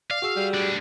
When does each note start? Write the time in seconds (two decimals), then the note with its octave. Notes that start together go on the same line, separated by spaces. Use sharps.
0.11 D5 F5
0.22 F#4 G#4 E6
0.37 G3
0.54 A2 D4